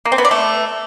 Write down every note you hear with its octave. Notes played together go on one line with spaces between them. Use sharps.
A#3
C4
B3
D5
A3